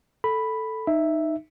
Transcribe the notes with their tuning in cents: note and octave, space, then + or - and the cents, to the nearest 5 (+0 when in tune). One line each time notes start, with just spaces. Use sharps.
A4 +0 B5 +0
D#4 -10 E5 +0